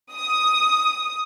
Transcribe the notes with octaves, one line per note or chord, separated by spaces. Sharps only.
D#6